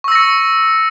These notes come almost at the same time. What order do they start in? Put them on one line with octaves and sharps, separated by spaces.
C#6 E6 A#6 C#7